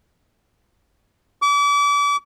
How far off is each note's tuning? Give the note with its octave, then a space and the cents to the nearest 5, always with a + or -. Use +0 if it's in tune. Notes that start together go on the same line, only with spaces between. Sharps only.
D6 -35